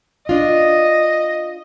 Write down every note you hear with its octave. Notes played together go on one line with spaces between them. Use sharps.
D4 F4 D#5